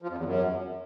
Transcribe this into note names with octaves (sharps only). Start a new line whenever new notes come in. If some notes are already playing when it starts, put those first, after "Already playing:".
F3
F2
E2
F#2